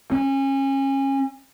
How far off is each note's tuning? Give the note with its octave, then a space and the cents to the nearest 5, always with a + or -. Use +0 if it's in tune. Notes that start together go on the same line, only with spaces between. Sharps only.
C#4 -30